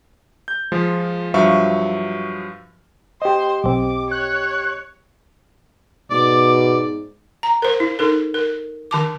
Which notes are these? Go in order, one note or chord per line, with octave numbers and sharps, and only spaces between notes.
G6
F3 G#3 F4
G2 F3 F#3 E5 F5 C#6
G4 C5 D#5
B1 C4 D6
C#5 F#6
G#2 B2 D5 D6
A#5
A#4 C5
E4
D#4 A4 A#4
A#4
D#3 A5 D6